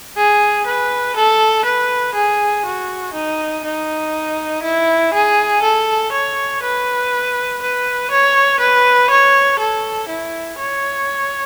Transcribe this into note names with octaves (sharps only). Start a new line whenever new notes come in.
G#4
B4
A4
B4
G#4
F#4
D#4
D#4
E4
G#4
A4
C#5
B4
B4
C#5
B4
C#5
A4
E4
C#5